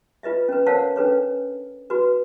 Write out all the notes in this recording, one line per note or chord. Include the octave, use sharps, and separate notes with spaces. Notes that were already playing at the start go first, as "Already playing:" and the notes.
F4 B4 D#5 E5
C#4 B4
A#4 C5 C#5 F5 F#5 A5
C#4 D4 A4 B4 C#5
F#4 B4